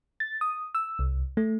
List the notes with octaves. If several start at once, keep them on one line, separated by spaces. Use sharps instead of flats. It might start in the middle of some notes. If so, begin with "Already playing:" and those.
A6
D#6
E6
C2
A3